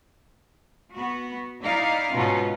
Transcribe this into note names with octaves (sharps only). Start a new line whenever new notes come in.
B3 F#4
D#4 E4 D5 F5
G#2 B2 B3 C#4 D#4 F4